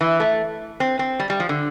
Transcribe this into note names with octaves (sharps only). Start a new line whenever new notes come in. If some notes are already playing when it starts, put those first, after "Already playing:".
E3
A3
C4
C4
G3
G3
F3
D3